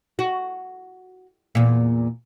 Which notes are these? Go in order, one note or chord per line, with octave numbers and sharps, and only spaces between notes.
F#4
E2 A#2